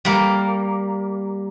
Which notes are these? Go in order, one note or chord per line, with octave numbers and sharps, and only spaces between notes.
G3 A#3